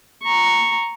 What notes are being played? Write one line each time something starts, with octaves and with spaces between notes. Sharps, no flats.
A#5 C#6